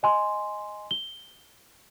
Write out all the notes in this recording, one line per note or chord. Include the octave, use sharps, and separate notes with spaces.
D#5 G#5 C6
G7